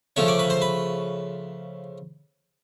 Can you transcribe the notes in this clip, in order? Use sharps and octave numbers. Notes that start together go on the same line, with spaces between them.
C#3 F3 A3 C#4 C#5
D5
B4
C5
B4